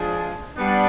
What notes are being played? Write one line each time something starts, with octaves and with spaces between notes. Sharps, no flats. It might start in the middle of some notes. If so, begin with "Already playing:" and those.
Already playing: F3 G#3 D4 G#4
G3 B3 D4